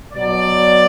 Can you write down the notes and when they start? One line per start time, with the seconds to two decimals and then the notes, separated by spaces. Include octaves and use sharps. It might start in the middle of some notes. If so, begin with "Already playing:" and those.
0.13 B2 F#3 B3 D5